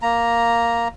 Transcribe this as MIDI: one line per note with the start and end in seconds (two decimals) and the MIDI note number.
0.02 0.88 58
0.02 0.88 82